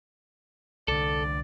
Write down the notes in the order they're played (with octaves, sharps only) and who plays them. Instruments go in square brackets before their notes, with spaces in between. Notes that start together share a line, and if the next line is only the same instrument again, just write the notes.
[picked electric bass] C2 D3 [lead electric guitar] A4 [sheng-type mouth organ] D5